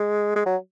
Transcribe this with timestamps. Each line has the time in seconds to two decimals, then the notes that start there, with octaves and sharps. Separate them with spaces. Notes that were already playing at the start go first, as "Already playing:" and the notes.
Already playing: G#3
0.35 G#3
0.46 F#3